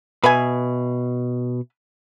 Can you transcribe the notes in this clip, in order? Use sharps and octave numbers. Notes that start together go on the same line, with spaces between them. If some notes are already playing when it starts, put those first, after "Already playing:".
B2 B4 E5 G#5